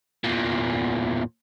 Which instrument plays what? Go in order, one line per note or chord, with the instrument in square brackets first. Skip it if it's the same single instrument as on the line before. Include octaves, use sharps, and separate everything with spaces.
[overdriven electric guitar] E2 A#2